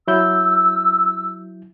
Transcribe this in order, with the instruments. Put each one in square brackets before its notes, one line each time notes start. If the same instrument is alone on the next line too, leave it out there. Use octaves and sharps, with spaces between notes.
[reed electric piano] F#3 E4 G6 [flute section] E6